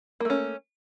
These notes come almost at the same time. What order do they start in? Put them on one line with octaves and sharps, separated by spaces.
A#3 A3 C#4